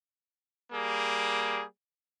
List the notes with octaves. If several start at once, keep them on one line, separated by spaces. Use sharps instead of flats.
G3 A#3 G#4